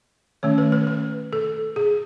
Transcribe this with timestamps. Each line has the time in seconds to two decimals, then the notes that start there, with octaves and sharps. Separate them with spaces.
0.43 D#3 A3 C#4 C#5
0.58 B4
0.72 B4
0.87 B4
1.33 A4
1.76 G#4